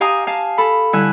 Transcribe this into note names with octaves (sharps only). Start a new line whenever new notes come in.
G4 F5 G#5 A#5 D#6
F5 G#5 A5
A4 B5
D3 G3 E4 G#5 E6 F#6